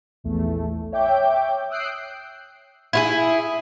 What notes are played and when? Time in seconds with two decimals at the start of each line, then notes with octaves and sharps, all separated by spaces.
0.24 A#1 E2 A3
0.92 C#5 E5 G5 D6 G6
1.70 D#6 E6 F#6 G6 C7 D7
2.93 E4 F4 G#4